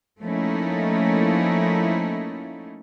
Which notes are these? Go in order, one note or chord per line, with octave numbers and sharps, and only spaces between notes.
F3 A3 A#3 C#4 D#4 E4